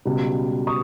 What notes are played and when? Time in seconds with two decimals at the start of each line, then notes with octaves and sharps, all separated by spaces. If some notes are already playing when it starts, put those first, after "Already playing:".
0.05 C#2 B2 G3
0.67 C#6 D#6